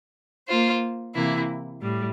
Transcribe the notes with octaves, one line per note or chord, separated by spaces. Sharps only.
A#3 F4 C5
C3 E3 A#3 E4
A2 G3